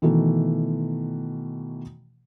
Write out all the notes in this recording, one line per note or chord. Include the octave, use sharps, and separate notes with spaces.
B2 D#3 E3 A3